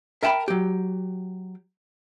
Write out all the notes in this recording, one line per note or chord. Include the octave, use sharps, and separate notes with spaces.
A#4 E5 G5 A5 B5
F#3 G4